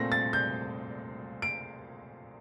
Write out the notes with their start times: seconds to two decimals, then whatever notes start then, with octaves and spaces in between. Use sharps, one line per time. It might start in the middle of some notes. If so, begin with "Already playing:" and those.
Already playing: A#2 A3 C4 A#6
0.12 A6
0.33 G6
1.42 D7